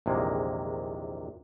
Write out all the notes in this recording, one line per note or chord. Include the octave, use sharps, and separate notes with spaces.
A#1 E2 C3 D#3 G#3 A#3